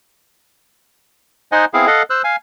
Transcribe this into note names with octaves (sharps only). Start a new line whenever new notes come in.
D#4 C5 D#5 F#5 G#5
B3 C4 E4 G#4 F5
A4 D#5 F5 F#5
C5 E6 F#6
F5 G#5